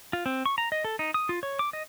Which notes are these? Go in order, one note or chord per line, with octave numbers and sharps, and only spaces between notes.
F4
C4
C#6
A#5
D#5
A4
D#4
D#6
F4
C#5
D6
D#5